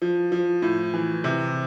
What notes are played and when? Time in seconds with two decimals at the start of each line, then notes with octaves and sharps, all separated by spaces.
0.02 F3
0.32 F3
0.62 A2
0.94 E3
1.24 C3